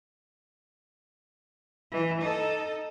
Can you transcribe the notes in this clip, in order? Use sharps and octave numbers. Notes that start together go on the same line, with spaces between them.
E3
D#4 A4